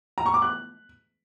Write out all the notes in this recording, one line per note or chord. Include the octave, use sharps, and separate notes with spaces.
A#5
C#6
D6
F#6